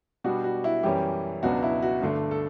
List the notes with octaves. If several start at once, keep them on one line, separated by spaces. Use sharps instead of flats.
B2 G3 B3 D4 F#4
F#4
E4
F#2 E3 G3 C#4 G4
C#2 B2 F#3 B3 D4 F#4
E4
F#4
G2 D3 A3 D4
A4